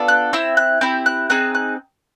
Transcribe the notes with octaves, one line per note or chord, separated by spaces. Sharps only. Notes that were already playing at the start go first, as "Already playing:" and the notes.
Already playing: B3 D4 F4 A4
F#6
C4 E4 E6
F#6
C4 E4 G4 G6
F#6
C4 D#4 G#4 F#6
F#6